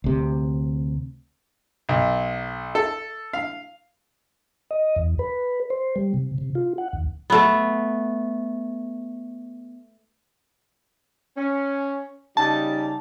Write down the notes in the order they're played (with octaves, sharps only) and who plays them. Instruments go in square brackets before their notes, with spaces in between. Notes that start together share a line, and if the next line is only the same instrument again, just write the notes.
[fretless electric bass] D2 C3
[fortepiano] B1
A4
F5
[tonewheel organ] D#5
E2
B4
C5
G3
C3
C3
F4
F#5
D#2
[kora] A3 B3
[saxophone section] C#4
[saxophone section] C#3 G3 D#4 [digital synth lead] A5